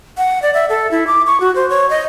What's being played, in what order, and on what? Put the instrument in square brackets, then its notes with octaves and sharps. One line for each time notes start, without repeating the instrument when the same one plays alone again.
[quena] F#5
D5
E5
A4
E4
D6
C#6
F#4
C5
C#5
D#5